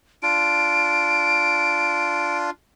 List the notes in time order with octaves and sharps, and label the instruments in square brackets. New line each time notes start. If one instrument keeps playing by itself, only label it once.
[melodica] D4 F4 [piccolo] D7